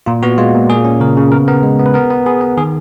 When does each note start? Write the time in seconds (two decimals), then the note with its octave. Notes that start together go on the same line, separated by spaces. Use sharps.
0.06 A#2 F4
0.23 B3 F#4
0.38 G#3 F4
0.54 A#2
0.70 A#3 G#4
0.85 C#4
1.00 C#3 A#4
1.17 C#3
1.32 B3 A#4
1.48 B3 A#4
1.63 G#3
1.79 B3
1.86 B4
1.94 B3 A#4
2.10 B3
2.26 B3 G#4
2.41 B3
2.57 D#3 G#4